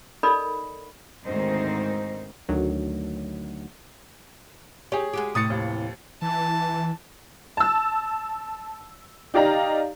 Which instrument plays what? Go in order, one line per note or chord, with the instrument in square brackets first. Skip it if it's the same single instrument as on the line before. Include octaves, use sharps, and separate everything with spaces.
[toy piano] D#4 A4 A#4 D5 D#5 B5
[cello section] D2 G#2 D#3 C4 D#4 C5
[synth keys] D2 D#3 F#3
[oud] G4 [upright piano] G#4 C#5
[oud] G#3 F#4 G4
[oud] A2 C3 E3 [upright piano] D#6 A6 C#7
[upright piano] D#2 F3
[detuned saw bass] E3 [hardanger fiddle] A5
[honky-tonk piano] A5 E6
D#4 G4 D5 F5 A#5